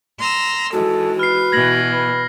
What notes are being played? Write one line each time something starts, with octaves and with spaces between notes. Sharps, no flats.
A#5 C6 E6
G#2 E3 F#4 A4
B4 F6 C7
B2 E3 G#6 A#6 F#7
B4